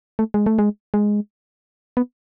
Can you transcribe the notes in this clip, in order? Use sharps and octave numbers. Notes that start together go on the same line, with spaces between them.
A3
G#3
A3
G#3
G#3
B3